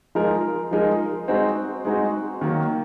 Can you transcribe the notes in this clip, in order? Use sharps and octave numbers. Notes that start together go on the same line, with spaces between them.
F3 G#3 D#4 A#4
F3 G#3 D#4 A#4
G#3 C4 D#4 F#4
G#3 C4 D#4 F#4
D#3 F#3 A#3